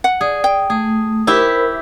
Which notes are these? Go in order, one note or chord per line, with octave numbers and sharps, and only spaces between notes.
F#5
G#4 D5
G5
A3 G#4
E4 G4 A#4 C5 E5 B5